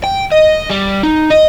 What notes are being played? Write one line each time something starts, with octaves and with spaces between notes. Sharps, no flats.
G5
D#5
G3
D#4
D#5